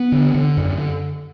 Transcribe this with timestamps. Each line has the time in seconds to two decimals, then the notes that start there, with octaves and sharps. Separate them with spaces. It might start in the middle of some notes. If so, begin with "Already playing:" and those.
Already playing: B3
0.12 D3
0.35 D3
0.57 F#2